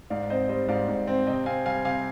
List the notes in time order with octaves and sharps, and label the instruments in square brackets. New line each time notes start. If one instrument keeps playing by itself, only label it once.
[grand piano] G#2 D5 F5
C4 C5 D#5
G3 C5 D#5
G#2 D5 F5
G#2
C4
C3 D#5 G5
C4 F5 G#5
G3 F5 G#5
C3 F5 G#5